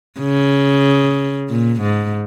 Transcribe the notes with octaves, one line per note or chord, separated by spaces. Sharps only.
C#3
A#2
G#2